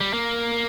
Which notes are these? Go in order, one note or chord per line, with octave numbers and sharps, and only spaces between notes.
G3
A#3